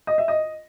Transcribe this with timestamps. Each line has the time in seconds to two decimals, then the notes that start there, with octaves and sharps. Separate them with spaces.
0.07 D#5
0.18 E5
0.28 D#5